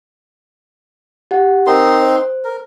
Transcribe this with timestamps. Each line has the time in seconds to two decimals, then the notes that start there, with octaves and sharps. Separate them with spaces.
1.31 G4 F#5
1.67 C4 D#4 A#4 C6
2.03 C5
2.45 A#4